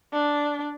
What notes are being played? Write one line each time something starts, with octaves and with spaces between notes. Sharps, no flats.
D4